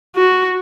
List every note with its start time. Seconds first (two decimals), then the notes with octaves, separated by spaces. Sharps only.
0.16 F#4